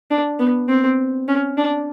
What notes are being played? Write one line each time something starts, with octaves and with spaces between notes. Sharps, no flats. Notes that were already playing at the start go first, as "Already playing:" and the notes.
D4
B3
C4
C#4
D4